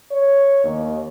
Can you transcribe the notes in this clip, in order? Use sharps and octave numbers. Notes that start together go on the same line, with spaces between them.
C#5
D#2